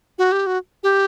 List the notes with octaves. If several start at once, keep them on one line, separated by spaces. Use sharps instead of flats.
F#4
G4
F#4
G4